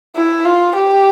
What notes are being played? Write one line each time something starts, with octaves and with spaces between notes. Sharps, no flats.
E4
F4
G4